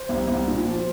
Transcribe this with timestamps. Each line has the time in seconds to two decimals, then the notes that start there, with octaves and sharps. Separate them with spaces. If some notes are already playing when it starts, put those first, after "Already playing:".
Already playing: C5
0.09 C2
0.27 C2
0.48 A#2
0.66 F3